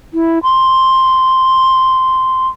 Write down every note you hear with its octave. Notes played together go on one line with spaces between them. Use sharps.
E4
C6